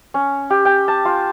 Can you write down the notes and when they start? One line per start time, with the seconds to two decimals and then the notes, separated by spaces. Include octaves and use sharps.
0.14 C#4
0.50 G4
0.65 G5
0.88 A5
1.05 F4